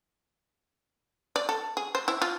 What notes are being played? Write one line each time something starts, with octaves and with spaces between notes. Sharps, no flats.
D5
A4
G#4
C5
E4
F4